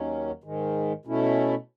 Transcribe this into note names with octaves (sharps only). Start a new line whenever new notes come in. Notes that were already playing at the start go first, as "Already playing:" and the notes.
Already playing: D#2 D#3 F#3 C#4
G#2 D#3 G#3
B2 A3 C#4 E4